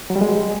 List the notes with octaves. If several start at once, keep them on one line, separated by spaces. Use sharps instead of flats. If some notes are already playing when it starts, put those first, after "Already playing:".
F#3
G3
G#3